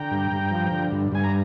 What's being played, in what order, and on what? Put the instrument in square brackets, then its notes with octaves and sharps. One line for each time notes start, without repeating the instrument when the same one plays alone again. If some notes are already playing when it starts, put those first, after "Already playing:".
Already playing: [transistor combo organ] D3 G5 A#5
G2
G2
F3
D3
G2
G2 G#5
A#5